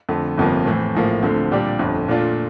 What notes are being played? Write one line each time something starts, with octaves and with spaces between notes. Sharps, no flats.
F2 D3 A3
G1 F2 C3 F3 A#3
A2 E3 A3 C4
A#1 A2 F3 A#3
D2 D3 F3 C4
A#2 G3 D4 G4
G1 F2 D3
A#2 A3 D4 F4